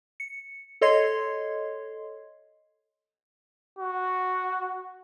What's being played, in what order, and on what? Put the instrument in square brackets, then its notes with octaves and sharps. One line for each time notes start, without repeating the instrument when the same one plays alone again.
[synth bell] C#7
A4 C#5 D#5 C6 G#6 C7
[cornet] F#4